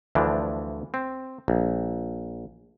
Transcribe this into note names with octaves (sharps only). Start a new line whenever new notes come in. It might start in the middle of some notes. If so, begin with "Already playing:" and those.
D2 E3 F3 D4
C4
A#1